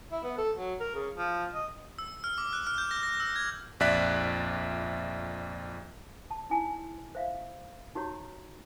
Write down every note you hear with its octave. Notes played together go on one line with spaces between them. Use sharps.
E4
B3
A4
F#3
A#4
C#3
F3
D#5
E6
F6
D6
F#6
F6
G6
A#6
A#6
E6
G#6
A#1 F2 D5 E5 F#6 B6
A5
D#4 E4 G#5 A5
C5 E5 F5
D#4 F#4 G4 C#5 A#5